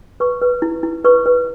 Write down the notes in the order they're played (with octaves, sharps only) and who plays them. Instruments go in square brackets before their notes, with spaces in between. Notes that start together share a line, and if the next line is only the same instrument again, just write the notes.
[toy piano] B4 C#6
B4
E4
E4
B4 C#6
B4